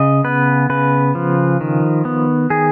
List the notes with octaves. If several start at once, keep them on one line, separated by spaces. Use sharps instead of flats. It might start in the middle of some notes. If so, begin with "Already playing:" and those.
Already playing: C#3 D#5
B3 B4
C#3 B4
F3
D#3
B3
D#3 G#4